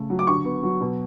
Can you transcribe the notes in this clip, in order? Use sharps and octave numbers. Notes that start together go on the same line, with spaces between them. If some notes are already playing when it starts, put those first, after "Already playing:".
Already playing: C#3 A3
F#3
D6
D3 C#6
B3
F#3
B2